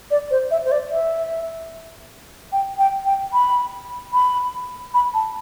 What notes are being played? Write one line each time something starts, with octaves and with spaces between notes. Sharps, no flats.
D5
C5
E5
C5
D5
E5
G5
G5
G5
B5
B5
B5
A5